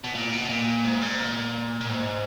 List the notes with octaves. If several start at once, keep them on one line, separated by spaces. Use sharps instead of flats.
B2
A#2
B2
A#2
G#2
A#2
A#2
G#2